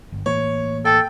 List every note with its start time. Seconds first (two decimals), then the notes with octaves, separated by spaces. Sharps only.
0.12 G1
0.26 A2 E3 A#3 C#5
0.85 A4 G5